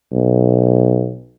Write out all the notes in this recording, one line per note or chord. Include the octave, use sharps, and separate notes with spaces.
B1